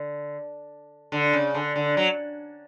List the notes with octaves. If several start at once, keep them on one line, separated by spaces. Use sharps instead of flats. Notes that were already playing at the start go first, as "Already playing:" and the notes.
Already playing: D3
D3
C#3
D3
D3
F#3